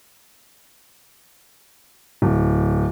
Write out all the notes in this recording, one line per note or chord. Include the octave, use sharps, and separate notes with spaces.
D1